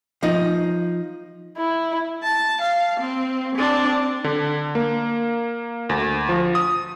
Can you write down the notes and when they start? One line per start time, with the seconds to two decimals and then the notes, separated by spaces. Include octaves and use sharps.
0.23 F3 D#4
1.57 E4
2.23 A5
2.61 F5
3.00 C4
3.55 C4 D4
4.24 D3
4.75 A#3
5.89 D2
6.29 F3
6.55 D#6